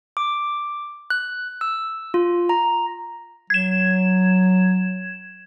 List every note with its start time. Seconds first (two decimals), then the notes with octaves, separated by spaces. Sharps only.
0.17 D6
1.10 F#6
1.61 E6
2.14 F4
2.49 A#5
3.50 F#3 G#6 E7